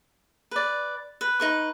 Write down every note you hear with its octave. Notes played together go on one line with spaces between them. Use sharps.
B4 D5
B4
D#4 B4 C#6